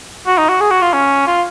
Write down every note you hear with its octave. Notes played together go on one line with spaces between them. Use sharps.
F#4
D#4
F#4
G#4
F#4
F4
C#4
F4